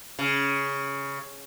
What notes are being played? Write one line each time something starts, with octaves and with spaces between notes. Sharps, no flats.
C#3